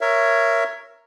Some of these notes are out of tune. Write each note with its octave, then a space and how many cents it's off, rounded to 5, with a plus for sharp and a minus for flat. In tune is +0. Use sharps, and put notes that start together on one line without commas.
A#4 +0 C#5 +0 E5 +20